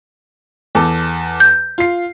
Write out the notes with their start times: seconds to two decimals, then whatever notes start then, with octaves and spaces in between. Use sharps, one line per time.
0.75 E2 A4 D6
1.40 G6
1.78 F4 C7